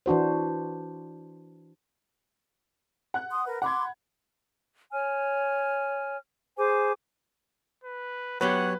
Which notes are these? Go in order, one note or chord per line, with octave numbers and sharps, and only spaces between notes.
E3 D4 F#4 C5
F#5 F#6
C6 D#6
A#4 B4
F#5 B5 C6 D6 G#6
C#5 G#5 F6
G#4 C5 G#5 D6
B4
F#3 B3 G4 B4 C#5 F#5